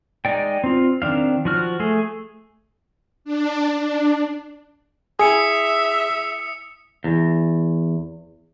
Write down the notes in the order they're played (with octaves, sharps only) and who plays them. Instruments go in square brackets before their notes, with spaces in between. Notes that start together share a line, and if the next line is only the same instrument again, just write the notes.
[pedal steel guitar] G#3 D#4 D5 G5
C4 F4
D#3 C4 D4 F5
F3 F#4 F6
A3 G#4
[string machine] D4
D4
[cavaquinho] E4 G#5 [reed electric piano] G#4 [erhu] E5 [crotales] D#6 C#7
[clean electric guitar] E2